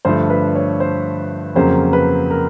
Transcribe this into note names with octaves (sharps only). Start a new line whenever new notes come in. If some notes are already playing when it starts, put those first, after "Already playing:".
G2 D3 F3 A3 C5
B4
C#5
C5
F2 C#3 F#3 A#3 C5
B4
A#4